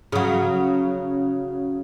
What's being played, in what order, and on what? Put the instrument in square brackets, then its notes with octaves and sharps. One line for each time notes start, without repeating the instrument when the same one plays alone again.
[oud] C#3 F#3